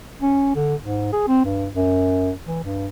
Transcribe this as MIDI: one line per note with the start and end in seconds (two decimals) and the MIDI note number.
0.21 0.51 61
0.55 0.75 50
0.80 1.10 44
1.12 1.23 68
1.28 1.44 60
1.45 1.68 43
1.74 2.32 42
2.46 2.59 52
2.64 2.87 43